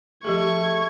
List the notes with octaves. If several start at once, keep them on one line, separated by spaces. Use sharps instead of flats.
F3 A3 G4 G#4 C#6 G#6